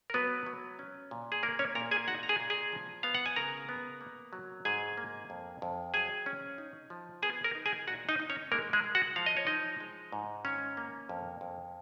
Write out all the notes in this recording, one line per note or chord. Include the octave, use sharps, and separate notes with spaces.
A#4
F#3 B3 B4
F#3
C#4
A#2
G#4
A#3 A#4
C#4 C#5
A#2 A#4 A#5
G#4 G#5
D#4 F#4 F#5
A#5
G#4 G#5
A#2
G#4 G#5
F3
B3 F5
F#5
G#5
C#3 A#4 A#5
B3
A#3
F#3
G#2 G#4 G#5
A#3
F2
F2
F#3 G#4 G#5
C#4
D#4
F3
B3 G#4 G#5
A#4 A#5
D#4
G#4 G#5
A#2 F#4 F#5
D#4 D#5
D#4
C#4 C#5
G#3 A#3 A#4
G#3 G#4
G#3
F#4 F#5
F3 F5
D#5
C#5
F3 D#4 D#5
G#3
G#2
D#3 C#4 C#5
A#3
F2
F2